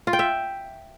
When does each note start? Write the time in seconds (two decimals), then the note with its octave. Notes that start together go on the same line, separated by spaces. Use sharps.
0.07 F4
0.13 G5
0.19 E5